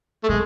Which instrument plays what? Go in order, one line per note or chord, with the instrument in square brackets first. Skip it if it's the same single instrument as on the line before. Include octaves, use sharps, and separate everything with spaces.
[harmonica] A3
[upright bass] B2 [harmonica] G#3